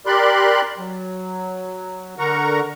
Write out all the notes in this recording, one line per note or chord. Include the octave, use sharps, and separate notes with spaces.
G4 A#4 D5 B5 C6 F#6
F#3
D3 A#4 F#5 A#5 C#6